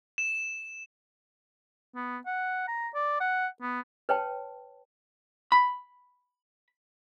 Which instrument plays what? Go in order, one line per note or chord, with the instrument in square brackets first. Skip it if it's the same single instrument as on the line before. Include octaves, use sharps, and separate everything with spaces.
[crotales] E7
[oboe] B3
F#5
A#5
D5
F#5
B3
[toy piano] B4 C#5 G5 A5
[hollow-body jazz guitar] B5